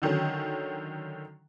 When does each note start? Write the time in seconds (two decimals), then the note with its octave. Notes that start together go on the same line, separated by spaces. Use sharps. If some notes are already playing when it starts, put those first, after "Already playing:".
0.02 D3 D#3 F#3 C#4